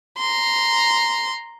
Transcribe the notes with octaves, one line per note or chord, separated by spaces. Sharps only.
A#5 C6